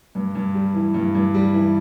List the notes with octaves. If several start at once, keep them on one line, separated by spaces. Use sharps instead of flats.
G2
G2
G3
E3
G2
G2
G3
E3